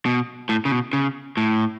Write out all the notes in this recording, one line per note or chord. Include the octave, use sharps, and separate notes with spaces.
B2
A2
C#3
B2
C#3
A2